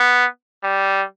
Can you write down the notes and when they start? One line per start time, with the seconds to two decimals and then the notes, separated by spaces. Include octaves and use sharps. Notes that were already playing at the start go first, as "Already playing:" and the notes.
Already playing: B3
0.63 G3